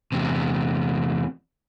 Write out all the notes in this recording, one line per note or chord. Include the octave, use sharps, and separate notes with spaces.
E2 C3